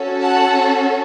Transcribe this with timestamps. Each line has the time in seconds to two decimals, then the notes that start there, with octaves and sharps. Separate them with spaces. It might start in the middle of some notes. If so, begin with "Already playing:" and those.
Already playing: C#4 F#4 A4
0.21 F#5 A5